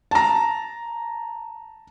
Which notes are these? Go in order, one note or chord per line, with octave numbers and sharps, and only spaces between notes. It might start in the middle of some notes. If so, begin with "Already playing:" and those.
A5 A#5